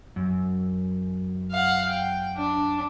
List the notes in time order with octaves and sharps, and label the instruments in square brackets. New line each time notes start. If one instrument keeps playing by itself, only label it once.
[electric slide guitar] F#2
[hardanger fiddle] F5 F#5
G5
D4